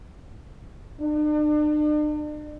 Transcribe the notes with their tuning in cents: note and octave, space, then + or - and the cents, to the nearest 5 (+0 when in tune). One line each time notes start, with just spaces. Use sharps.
D4 +45